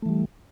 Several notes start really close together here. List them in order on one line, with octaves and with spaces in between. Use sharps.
A3 E3 G3